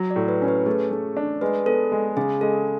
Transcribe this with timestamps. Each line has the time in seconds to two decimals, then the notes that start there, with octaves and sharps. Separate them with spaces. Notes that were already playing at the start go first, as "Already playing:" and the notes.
Already playing: F#3
0.11 D5
0.16 A2
0.28 B4
0.42 C#4
0.48 B4
0.66 A3 G#4
0.91 A3
1.17 D4
1.41 G#3 B4
1.66 B3 A4
1.92 G#3
2.17 C#3 G#4
2.41 G#3 A4